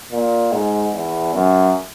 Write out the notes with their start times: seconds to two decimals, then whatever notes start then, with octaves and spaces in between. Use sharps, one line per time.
0.12 A#2
0.52 G#2
0.94 E2
1.34 F#2